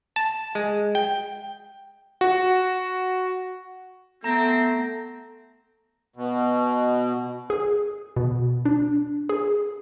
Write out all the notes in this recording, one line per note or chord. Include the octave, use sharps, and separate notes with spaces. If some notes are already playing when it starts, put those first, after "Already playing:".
A5
G#3
G5
F#4
A3 B3 C4 A#5 A#6
B2
G#4
B2
D4
G#4